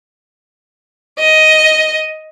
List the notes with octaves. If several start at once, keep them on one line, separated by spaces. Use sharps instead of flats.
D#5